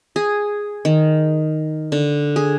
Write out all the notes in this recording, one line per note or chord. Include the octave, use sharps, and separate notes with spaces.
G#4
D#3
D3
G#4